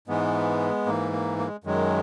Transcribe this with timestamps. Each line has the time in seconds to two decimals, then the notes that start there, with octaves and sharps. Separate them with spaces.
0.08 G#2 E3 G#3 B3
0.86 G#2 E3 A#3
1.12 A#3
1.38 A#3
1.47 G#3
1.64 F#2 D#3 F#3 G#3